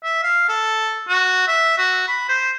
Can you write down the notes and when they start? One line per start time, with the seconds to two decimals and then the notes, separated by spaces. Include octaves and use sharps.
0.04 E5
0.23 F5
0.49 A4
1.09 F#4
1.48 E5
1.78 F#4
2.08 B5
2.29 C5